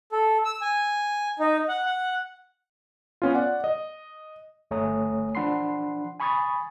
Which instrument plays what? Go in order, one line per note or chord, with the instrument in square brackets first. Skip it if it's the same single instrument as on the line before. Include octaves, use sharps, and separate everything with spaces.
[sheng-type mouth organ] A4
E6
G#5
D#4
F#5
F#5
[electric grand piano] B3 C#4 F4
D5 F#5
D#5
[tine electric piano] G1 A3 C#5 G#5 A#5 D#6
F3 D4 F#5 B5 C6 C7
G#5 B5 C#6 D#6 G#6 A6